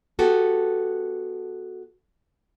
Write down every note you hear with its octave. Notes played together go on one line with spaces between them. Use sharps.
B3 F#4 G4 A4